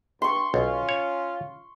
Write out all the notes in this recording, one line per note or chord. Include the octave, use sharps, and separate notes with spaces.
G2 C6 C#6
B1 C#4 F4
C#5